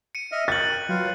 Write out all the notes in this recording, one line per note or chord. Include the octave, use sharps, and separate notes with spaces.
C#7 D#7
D#5 E5 F6
A#4 G5 F#6 A6 F#7
F#3 F4 B4 F5